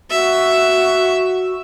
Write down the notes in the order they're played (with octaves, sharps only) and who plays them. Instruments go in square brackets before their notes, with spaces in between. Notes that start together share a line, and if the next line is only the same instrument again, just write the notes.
[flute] F#4 [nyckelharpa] E5